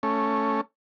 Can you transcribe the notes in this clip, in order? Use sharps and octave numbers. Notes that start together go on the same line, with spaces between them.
A3 C#4